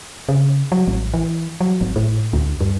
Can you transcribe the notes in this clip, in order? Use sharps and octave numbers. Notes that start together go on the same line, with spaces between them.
C#3
F#3
A1
E3
F#3
G#1
A2
D2
G2